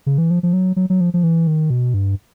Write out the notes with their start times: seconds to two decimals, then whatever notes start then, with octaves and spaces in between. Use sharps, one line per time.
0.06 C#3
0.18 E3
0.31 F3
0.43 F3
0.53 F#3
0.76 F#3
0.90 F#3
1.00 F3
1.14 F3
1.23 E3
1.47 D#3
1.70 B2
1.94 G2